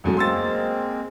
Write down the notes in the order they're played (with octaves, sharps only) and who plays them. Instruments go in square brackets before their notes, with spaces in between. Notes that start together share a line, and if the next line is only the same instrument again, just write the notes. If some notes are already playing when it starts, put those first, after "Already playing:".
[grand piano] E1 F#2 A3
[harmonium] G#3 A#3 C4 [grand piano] C6 E6 A6